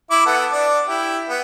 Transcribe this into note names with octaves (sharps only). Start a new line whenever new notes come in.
E4 D6
B3 A4 F#5
D4 D6
E4 G4
B3